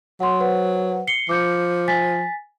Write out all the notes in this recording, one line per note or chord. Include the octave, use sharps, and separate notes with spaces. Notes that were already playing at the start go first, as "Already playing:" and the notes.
F#3 F#5 C6
B4 C5 F#5
C7 C#7 G7
F3 D6 G6 C#7
G#5 A6 B6